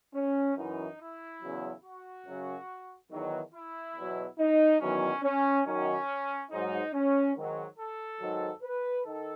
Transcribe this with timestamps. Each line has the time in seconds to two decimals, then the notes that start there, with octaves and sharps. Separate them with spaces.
0.15 C#4
0.57 F#2 E3 D#4
1.00 E4
1.42 E2 C#3 F#3
1.84 F#4
2.27 F#2 C#3 F#3
3.11 E2 D#3 F#3
3.54 E4
3.96 E2 B2 F#3
4.39 D#4
4.81 E2 D#3 F#3 C#4
5.23 C#4
5.66 F#2 D#3 F#3 C#4
6.51 G#2 F#3 D#4
6.94 C#4
7.36 G#2 D#3 F#3
7.79 A4
8.21 G#2 D#3 F#3
8.63 B4
9.05 D#3 A4